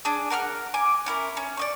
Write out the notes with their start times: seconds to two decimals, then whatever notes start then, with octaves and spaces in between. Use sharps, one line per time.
0.05 D4 G#4
0.30 A#4 F#5 C6 F6
0.74 G#5 D6
1.06 C#4 E4 A#4
1.37 C#4
1.57 D5 D#5 C#6